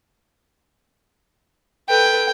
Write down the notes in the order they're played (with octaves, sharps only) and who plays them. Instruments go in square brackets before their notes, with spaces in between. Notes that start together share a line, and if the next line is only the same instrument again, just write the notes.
[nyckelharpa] A4 B4 [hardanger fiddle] G5